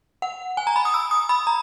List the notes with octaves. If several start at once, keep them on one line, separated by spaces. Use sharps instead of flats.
F#5
G#5
A#5
B5
D#6
E6
D#6
B5
A#5